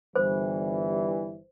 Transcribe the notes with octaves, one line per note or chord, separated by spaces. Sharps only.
G1 E3 G3 C5